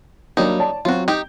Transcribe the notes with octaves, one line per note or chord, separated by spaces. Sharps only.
F#3 G3 A#3 D4 D#4
C#5 D5 A5
F#3 C4 F4 F#4
D#4 G4 G6